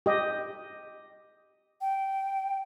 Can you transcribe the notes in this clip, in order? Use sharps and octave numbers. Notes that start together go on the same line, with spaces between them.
G4 D#5
G5